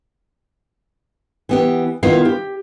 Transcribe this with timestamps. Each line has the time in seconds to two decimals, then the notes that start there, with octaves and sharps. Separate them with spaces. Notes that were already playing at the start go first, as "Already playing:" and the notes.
1.49 E3 B3 G4
2.03 D#3 B3 E4 F4 F5
2.25 G4